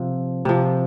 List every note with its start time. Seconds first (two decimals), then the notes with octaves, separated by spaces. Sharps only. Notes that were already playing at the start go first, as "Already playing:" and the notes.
Already playing: C3 F3
0.45 C3 F3